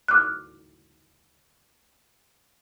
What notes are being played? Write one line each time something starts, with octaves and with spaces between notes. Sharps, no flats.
D6 F6 F#6